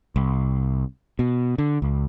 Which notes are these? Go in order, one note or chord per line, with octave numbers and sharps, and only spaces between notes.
C2
B2
D3
C#2